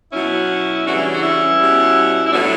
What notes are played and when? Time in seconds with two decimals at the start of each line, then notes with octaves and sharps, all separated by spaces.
0.13 B2 F#3 C#4 E4
0.86 C#3 E3 G3 D4 F#4
0.95 C#4 E4
1.14 D4 F#4
1.23 C#4 E4
1.59 B2 G3
2.27 E4
2.32 A2 F#3 B3 D4